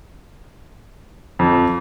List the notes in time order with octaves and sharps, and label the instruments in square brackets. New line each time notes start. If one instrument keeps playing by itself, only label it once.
[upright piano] F2